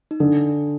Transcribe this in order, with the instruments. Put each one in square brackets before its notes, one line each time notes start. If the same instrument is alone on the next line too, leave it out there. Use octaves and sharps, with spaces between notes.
[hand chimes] D#4
[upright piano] D3 [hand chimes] D4